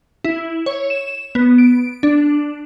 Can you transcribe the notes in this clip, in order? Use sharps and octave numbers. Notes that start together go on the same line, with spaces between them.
E4
C#5
E7
B3
D7
D4